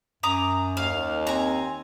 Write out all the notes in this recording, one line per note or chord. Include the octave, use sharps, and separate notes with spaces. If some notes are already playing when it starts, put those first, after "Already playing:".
F#2 A#5 D6 D#6
D#2 F5
C4 G#5 A#5